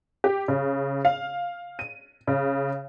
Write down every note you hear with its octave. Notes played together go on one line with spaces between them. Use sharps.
G4
C#3
F5
D#7
C#3